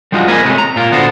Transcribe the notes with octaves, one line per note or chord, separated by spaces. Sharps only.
G3 G#3 D#4 F4 F#4
A#3 G#4 A#4 B4 D#5 G#5
C3 G#3 A3 C#4
A#5
A#2 F4 A#4
D3 B3 F#4 A4 C5